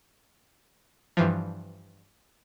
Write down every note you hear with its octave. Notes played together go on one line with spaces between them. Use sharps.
G2 E3 F3